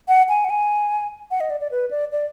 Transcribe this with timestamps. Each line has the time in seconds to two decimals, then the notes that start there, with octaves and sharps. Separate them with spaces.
0.08 F#5
0.29 G#5
0.45 F#5
0.50 G#5
1.31 F#5
1.40 D#5
1.50 D5
1.60 D5
1.71 B4
1.91 D5
2.12 D5